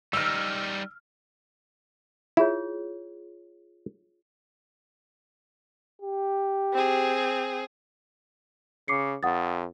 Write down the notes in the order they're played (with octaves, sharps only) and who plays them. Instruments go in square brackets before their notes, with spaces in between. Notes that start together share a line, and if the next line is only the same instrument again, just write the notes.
[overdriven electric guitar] G3 D#4 [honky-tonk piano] E6 F6
[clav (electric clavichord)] E4 [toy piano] F4 G#4 C#5
[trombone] G4
[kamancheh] C4 G#4
[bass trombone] C#3 [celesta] D6 C7 C#7
[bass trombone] F2 [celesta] F#5 D#6 A6